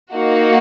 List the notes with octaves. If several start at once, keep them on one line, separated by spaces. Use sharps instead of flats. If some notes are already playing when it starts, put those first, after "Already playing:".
A#3 D#4 F#4